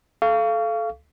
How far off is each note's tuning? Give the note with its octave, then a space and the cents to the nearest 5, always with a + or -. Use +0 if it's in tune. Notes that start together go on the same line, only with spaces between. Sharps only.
A4 -20 F5 -20 C#6 +30